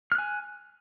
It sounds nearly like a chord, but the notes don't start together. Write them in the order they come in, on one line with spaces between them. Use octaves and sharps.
F6 F#6 G#5